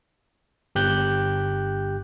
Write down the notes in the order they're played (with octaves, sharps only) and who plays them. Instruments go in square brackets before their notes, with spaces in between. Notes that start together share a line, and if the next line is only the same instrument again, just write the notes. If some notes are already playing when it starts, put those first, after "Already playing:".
[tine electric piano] G1 G4 F#6 G6